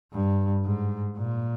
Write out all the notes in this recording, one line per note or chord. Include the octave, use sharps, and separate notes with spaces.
G2
G#2
A#2